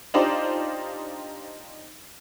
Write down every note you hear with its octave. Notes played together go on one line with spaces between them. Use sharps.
D4 D#4 F4 G4 C5 D5